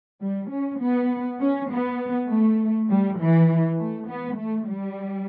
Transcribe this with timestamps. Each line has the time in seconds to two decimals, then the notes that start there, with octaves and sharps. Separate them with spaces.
0.21 G3
0.51 C#4
0.81 B3
1.40 C#4
1.70 B3
2.29 A3
2.90 G3
3.20 E3
3.78 A3
4.08 B3
4.38 A3
4.68 G3